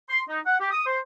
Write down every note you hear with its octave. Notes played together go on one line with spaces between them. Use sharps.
C6
D#4
F#5
G4
D#6
C5